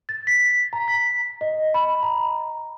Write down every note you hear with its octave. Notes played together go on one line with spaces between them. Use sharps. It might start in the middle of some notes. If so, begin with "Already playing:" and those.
A6
B6
A#5
B6
D#5
B5
A#5